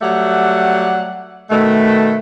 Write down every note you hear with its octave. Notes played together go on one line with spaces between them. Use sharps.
F#3 G3 A3 G4 F#5
B2 D#3 A3